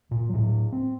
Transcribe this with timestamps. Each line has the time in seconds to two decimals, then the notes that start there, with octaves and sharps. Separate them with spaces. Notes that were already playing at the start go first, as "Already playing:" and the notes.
0.11 A#2
0.29 A2 F#3
0.73 C4